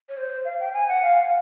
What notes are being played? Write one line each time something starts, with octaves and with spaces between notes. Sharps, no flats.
C#5
C5
F5
G5
G#5
F#5
F5